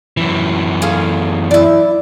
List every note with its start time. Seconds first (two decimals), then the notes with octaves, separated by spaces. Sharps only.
0.17 F#2 E3
0.82 G#4 A4 F5
1.51 E4 D5 E5